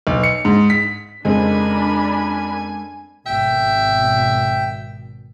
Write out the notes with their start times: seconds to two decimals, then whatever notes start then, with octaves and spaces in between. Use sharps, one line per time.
0.07 B1
0.23 C#7
0.45 G#2
0.70 B6
1.25 F2 C#3 G#3 C4 D4 A#4 G#5 B5
3.26 G#1 B2 E5 G5